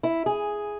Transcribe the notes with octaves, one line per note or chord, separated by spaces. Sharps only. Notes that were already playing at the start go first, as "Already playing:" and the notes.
E4
G#4